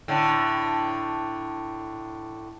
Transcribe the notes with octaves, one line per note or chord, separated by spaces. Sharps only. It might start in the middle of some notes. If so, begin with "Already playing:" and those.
A2 D3